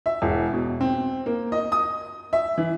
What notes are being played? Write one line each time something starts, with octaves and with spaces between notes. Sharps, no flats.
E5
E1
B2
C4
A#3
D#5
D#6
E5
E3